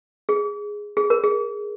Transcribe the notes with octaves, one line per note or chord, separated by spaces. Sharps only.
G#4
G#4
A#4
G#4